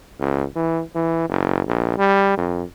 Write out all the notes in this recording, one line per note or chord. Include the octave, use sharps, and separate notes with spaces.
C#2
E3
E3
F#1
A#1
G3
F2